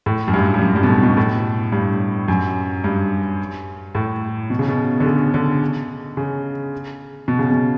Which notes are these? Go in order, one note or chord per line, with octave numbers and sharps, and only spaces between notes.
A2
F#2
G2
G2
F#2
G2
B2
A2
B2
A2
G2
F#2
G2
A2
B2
C#3
B2
D3
C#3
D3
C#3
B2
C#3
B2